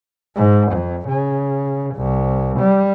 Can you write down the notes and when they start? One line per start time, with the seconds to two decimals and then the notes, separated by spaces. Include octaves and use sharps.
0.36 G#2
0.73 F2
1.09 C#3
1.96 C2
2.60 G3